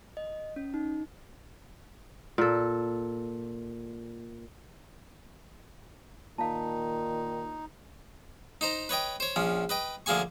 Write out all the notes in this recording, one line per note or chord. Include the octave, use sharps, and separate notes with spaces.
D#5
C#4
D#4
A#2 A4
A#2 D#3 D#4 F5 A5
D#4 C5 A#5
B4 C#5 D#5 G5
C5 C#5
A#1 F3 C#4
B4 D#5 G5
D2 F3 A#3 G#4 G#5 C#6